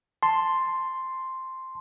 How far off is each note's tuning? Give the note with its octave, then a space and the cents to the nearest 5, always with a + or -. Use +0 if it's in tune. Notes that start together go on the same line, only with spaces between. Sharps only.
A5 +0 C6 +0